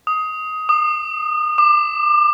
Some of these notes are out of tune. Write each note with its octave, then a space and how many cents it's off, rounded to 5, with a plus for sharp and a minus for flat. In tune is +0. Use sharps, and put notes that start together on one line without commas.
D#6 +15
D#6 -35
D6 +30